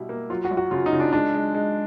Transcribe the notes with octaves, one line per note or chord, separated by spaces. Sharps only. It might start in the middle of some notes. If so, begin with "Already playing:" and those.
Already playing: B2 G3 E4
A#3
F#3 F4
F#4
F#2
F#4
C#3 F4
D#4
C#3
D4
G#3 D4
G#3
G#3